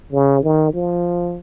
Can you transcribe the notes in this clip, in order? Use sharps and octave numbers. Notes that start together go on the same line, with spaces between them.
C#3
D#3
F3